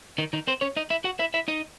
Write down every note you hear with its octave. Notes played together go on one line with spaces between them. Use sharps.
D#3 D#4
D#3 D#4
C4 C5
C#4 C#5
D#4 D#5
E4 E5
F#4 F#5
E4 E5
E4 E5
D#4 D#5